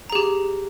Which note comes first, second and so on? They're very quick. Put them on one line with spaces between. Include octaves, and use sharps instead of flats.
A#5 G#4 G4